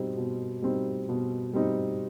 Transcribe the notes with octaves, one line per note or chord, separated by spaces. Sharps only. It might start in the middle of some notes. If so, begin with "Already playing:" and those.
Already playing: B2 G3 C4 D#4
B2
G3 C4 D#4
B2
G3 C4 D#4